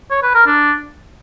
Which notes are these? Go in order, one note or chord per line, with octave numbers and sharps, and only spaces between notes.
C#5
B4
A#4
D4